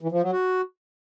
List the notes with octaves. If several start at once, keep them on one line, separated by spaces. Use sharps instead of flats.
E3
F3
F#3
F#4